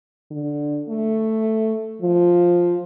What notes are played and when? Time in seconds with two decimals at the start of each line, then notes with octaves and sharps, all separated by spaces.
0.31 D3
0.89 A3
2.02 F3